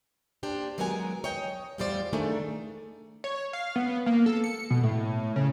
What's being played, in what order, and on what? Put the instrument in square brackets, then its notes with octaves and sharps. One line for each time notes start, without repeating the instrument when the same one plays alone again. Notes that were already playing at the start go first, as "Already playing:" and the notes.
[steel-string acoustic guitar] A#3 D4 G4 C5
D#3 F#3 G#3 B3 A#4 G#5
C#5 D#5 G5
E2 A2 G3 F4 C5 D5
D#3 A3 D4 D#4 G#4
[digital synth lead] C#5
F5
B3
A#3
A4
C#7
B2
A2
C#3